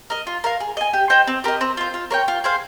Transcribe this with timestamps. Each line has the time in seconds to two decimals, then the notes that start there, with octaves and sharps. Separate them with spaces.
0.10 A#4 D#5
0.27 F4
0.44 A#4 F5
0.60 G#4
0.77 D#5 G#5
0.93 G4
1.10 C5 D#5 G5
1.27 C4
1.44 G4 A#4 D#5
1.61 C4
1.77 F4 C5
1.94 F4
2.11 A#4 C#5 G5
2.28 F4
2.44 G#4 C5 F5